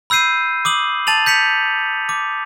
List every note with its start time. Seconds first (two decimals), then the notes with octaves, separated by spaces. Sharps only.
0.10 B5 E6 G6 C7 D#7
0.65 D6 D#6 F#7
1.07 A5 A6 D#7 F7 F#7
1.26 G6 B6 C#7 F7
2.09 D6